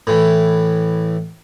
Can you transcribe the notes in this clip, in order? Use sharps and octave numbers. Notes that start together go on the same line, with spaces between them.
A2 E3